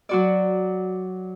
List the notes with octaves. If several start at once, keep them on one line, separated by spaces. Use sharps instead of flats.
F#3 F#4 D5